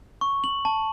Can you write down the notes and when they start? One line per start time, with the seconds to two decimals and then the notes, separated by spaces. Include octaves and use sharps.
0.21 C#6
0.44 F#7
0.65 A5